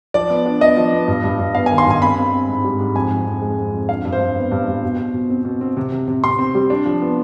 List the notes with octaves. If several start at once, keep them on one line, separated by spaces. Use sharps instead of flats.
F3 D5
B3
D4
B3 D#5
F3
B3
G2
G2
G2
B3 F5
D#3 G#5
C6
G2 G#5
C4 B5
C4
C4
G#2
G3
G#2
F2 G#5
F2
F2
G#3
F2
F2
D4 F5
G2
C5
G2
B3
G2
G2
B2
B2
B2
C4
B2
C4
C3
C3
C3
C3 C6
C4
G3
D4
F3
B3